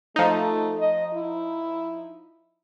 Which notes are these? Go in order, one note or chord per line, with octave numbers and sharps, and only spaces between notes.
F3 A3 D#4
D#5
E4